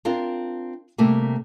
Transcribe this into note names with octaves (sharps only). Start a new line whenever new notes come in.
C4 D4 F4 A#4
C3 G3 A3 A#3